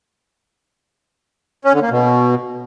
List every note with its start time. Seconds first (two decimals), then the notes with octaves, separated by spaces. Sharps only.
1.65 C#4
1.73 D3
1.82 A#3
1.91 B2